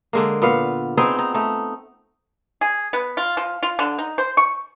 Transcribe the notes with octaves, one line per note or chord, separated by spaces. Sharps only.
D3 G#3 A#3
A#2 B3 F5
B3 C4 D#4 G#4
D#4
A3 D#4
G#4
B3
F4
F3
F4
D3
D#4
C5
C#6